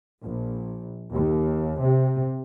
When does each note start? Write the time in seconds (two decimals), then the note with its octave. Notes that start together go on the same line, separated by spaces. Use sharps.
0.22 A#1
1.12 D#2
1.81 C3